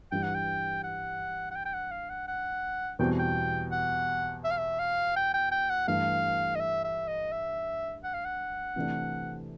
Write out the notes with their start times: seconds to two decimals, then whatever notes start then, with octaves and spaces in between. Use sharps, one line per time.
0.12 G2 E3 G3 G5
0.23 F#5
0.35 G5
0.84 F#5
1.51 F#5
1.55 G5
1.65 G5
1.74 F#5
1.91 F5
2.10 F#5
2.28 F#5
2.99 E2 B2 G3 C4 G5
3.19 G5
3.72 F#5
4.44 E5
4.51 F5
4.58 E5
4.79 F5
5.16 G5
5.34 G5
5.51 G5
5.69 F#5
5.87 G2 E3 A3 F5
6.55 D#5
6.60 E5
6.84 E5
7.08 D#5
7.32 E5
8.04 F#5
8.14 F5
8.25 F#5
8.76 C3 E3 A3 D4